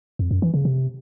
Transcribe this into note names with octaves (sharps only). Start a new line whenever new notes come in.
F2
F#2
E3
C#3
C3